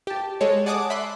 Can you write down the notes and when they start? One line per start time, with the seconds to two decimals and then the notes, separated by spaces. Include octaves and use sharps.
0.07 G4 A5
0.41 G#3 A4 C#5
0.66 D5 F#5 G#5 A5 D6 D#6
0.90 E5 B5 C6 F#6